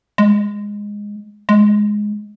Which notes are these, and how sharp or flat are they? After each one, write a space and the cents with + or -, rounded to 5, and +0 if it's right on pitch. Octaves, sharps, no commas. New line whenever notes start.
G#3 -10
G#3 +5